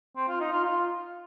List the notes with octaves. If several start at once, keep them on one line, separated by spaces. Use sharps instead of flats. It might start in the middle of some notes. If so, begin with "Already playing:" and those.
C4
F4
D#4
F4
F4